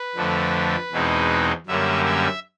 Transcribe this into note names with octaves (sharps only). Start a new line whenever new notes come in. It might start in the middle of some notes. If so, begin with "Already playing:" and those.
Already playing: B4
F2 D3 F3 A3 D4
E2 B2 G#3 C4 D#4
F#2 D3 G3 A#3 C#4 E5
E5